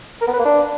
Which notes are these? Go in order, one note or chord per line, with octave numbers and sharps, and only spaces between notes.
A#4
B3
B4
A#3
D4